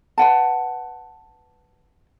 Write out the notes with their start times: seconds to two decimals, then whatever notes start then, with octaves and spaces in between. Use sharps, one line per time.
0.18 B4 F#5 A5